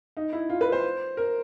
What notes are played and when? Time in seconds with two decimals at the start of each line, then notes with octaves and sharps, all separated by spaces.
0.17 D#4
0.33 E4
0.49 F4
0.61 B4
0.72 C5
1.17 A#4